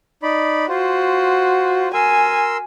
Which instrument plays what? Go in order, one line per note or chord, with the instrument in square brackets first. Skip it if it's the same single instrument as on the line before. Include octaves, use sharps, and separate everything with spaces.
[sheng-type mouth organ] D#4 D5 B5
[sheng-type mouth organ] F4 C5 [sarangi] F#4
[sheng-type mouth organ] A#4 C6 E6 [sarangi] G#5